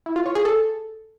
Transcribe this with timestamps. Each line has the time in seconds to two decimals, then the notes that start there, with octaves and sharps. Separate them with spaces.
0.06 E4
0.16 F4
0.26 C#5
0.35 G#4
0.45 A4